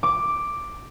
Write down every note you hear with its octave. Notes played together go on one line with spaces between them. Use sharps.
D6